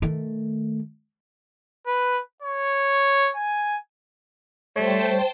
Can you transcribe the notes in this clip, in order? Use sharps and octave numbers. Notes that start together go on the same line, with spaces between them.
D#3 A3
B4
C#5
G#5
G3 A3 C5 C#5 G5 A5